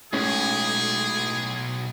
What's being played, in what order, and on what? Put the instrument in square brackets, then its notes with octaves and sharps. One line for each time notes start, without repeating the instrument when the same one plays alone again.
[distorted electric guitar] B1 [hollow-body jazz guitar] A2 G#3 C#4 [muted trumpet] G#4